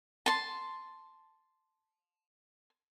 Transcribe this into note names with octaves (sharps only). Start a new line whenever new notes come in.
A5 C6